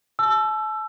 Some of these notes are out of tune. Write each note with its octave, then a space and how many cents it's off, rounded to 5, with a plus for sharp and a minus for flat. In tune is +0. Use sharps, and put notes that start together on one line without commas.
A5 -35 E6 +20